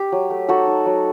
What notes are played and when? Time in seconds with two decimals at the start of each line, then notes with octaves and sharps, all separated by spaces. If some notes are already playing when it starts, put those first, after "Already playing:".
Already playing: G4
0.12 F#3
0.30 A3
0.48 D#4 F#4 A4
0.67 D#4
0.86 F#3